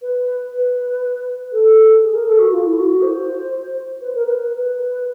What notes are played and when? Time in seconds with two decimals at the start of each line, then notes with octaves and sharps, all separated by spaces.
0.02 B4
0.52 B4
1.52 A4
2.02 G#4
2.14 A#4
2.27 A4
2.39 F#4
2.52 F4
2.65 E4
2.77 F#4
2.89 F#4
3.02 C5
4.01 B4
4.14 A#4
4.26 B4
4.51 B4